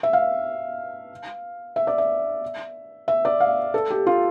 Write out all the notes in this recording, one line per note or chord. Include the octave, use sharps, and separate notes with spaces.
E5
F5
E5
D5
E5
E5
D5
F5
A4
G4
F4